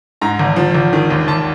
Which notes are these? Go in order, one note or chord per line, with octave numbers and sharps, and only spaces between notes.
G#2 A#5
G#1
F3
G#1
D#3
D#2
D#2 A5